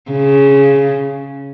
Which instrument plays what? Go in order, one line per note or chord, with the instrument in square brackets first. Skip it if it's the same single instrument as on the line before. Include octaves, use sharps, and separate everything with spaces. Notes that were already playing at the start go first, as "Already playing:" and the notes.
[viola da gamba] C#3